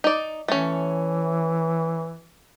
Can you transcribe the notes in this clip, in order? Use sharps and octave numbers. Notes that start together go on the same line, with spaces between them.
D#4 D5
E3 A3 C#4